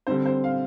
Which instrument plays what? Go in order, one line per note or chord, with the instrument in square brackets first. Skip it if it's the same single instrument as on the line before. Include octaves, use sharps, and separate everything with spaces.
[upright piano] D3 G3 C4 C5
C5
F5